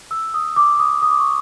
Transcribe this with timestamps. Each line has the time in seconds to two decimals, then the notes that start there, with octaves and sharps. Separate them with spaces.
0.11 E6
0.34 D#6
0.56 D6
0.79 D#6
1.02 D#6
1.11 D6
1.19 C#6